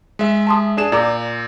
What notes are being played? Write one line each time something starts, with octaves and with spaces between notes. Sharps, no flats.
G#3 E5
A5 C6 D#6
D4 G#4 E7
A#2 D5 A#5 D6